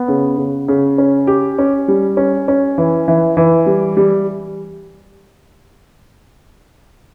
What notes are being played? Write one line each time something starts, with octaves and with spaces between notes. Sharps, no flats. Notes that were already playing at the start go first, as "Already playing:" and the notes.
Already playing: B3
C#3
C#3
C#3
C#4
G4
C#4
G3
C#4
C#4
E3
E3
E3
G3
G3